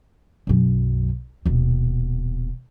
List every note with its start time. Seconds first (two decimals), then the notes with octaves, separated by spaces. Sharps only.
0.47 B1 F#2
1.45 D#1 B2